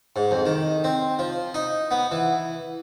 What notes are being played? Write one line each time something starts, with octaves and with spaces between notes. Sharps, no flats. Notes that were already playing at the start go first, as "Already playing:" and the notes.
G#2
F2
D#3
C4
F3
D#4
B3
E3